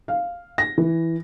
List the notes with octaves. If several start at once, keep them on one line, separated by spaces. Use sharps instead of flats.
F5
A#6
E3